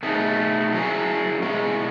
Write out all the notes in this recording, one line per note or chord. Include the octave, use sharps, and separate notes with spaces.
B2 A3 D#4 G#4
F#3 C#4 E4 G#4
B2 G#3 C#4 E4 G#4